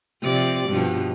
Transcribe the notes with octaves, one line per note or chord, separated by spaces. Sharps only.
C3 F3 D5
G2 B2 F3